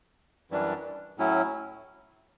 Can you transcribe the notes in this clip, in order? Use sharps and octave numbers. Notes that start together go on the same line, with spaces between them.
F#2 E3 G3 D4
A2 F#3 C#4 E4